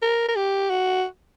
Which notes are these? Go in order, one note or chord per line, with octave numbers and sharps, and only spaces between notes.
A#4
A#4
G4
F#4